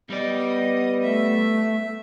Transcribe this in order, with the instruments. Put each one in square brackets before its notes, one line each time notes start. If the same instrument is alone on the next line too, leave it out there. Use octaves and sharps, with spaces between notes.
[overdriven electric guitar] G3 D5 [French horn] B3 [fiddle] D#5
[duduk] A3 [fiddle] E5